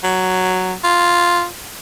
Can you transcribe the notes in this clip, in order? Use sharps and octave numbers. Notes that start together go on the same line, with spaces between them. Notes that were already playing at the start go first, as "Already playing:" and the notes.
F#3
F4